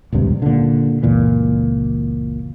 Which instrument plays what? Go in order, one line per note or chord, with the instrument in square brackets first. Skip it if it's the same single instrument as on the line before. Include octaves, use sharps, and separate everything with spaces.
[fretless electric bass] D#1 C#2 G2 C3
A#2 D3
F#1 C#2 A#2 E3